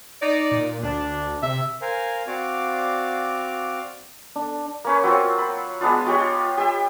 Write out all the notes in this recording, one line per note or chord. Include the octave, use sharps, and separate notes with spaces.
D#4 D5
A#2
D2 D4
C3 E5
A#4 C5 F5 G#5
C4 F#4 D5 F5 D6
D4
A#3 C#4 B4
F#3 C4 F4
B5
G#3 B3 D4 F4
F4 G4 C#5 D#5
G4 E5